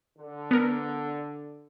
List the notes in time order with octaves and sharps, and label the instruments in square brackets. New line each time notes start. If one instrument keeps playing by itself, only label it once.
[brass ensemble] D3
[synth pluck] B3 A#4